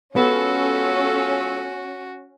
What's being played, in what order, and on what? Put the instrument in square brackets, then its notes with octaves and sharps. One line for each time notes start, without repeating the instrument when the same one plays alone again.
[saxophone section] G#3 F4 A4 [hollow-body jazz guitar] B3 [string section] C#4 [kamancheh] F#4